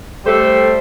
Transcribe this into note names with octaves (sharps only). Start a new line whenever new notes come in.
G3 A3 A4 C5